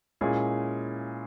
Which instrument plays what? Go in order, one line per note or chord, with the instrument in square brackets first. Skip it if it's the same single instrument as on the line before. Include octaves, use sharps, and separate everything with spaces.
[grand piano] A#2 G#3 C#4 E4 G#4